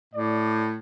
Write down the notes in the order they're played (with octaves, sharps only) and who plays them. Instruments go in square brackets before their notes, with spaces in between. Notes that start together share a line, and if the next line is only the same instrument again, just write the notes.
[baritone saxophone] A2 [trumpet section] D5